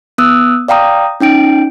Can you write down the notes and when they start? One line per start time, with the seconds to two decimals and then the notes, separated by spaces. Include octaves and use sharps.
0.18 B3 D#6 E6 F#6
0.68 D5 F5 G5 A#5 D#6
1.20 C#4 D#4 G5 D7